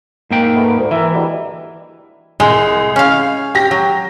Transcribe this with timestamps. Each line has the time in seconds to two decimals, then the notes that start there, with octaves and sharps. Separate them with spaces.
0.31 G#2 A#3 G5
0.56 A3 B3
0.78 D2
0.91 E3 A#4 E5
1.13 B2 D3 G3
2.40 C2 G#3
2.96 C#4 F5
3.55 G4 A#6
3.71 F#3